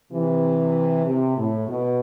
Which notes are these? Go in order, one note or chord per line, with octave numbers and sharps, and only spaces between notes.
C3 E3
C3
A2
B2